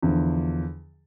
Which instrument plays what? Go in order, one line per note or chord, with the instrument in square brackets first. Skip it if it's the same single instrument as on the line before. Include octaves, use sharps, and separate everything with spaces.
[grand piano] E2 D3 F3